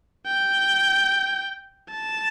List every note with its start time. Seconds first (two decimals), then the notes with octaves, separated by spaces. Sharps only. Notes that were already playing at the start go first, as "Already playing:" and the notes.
0.26 G5
1.90 A5